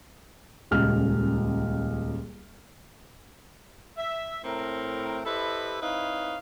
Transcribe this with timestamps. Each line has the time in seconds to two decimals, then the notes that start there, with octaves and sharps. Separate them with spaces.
0.71 D#1 C#2 F6
3.97 E5
4.44 A2 C4 A#4
5.25 E4 G4 A4 B4 C5 D#5
5.82 C4 D#4 E4 B4 C#5 F5